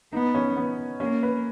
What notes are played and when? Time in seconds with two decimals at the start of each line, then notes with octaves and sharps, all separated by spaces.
0.13 B3 D#4
0.35 C#4
0.57 B3
1.00 A#3 C#4
1.23 B4